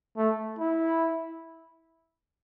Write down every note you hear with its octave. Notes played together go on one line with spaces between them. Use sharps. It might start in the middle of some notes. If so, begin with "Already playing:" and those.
A3
E4